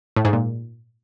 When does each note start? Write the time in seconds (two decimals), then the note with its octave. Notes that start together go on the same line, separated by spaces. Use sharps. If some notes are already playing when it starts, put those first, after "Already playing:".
0.16 A2
0.25 G#2
0.33 A#2